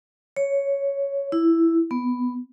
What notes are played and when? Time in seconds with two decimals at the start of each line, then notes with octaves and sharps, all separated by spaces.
0.36 C#5
1.32 E4
1.91 B3